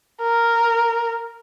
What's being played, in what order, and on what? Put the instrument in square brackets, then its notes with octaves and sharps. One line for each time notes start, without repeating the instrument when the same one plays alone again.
[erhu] A#4